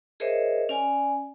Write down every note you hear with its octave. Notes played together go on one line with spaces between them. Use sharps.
G#4 A#4 C5 C#5 D#5 E5
C#4 D5 G#5